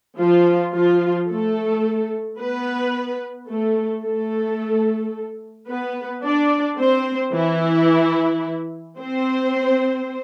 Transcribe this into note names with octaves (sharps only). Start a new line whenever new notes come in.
F3 F4
F3 F4
A3 A4
B3 B4
A3 A4
A3 A4
B3 B4
D4 D5
C4 C5
E3 E4
C4 C5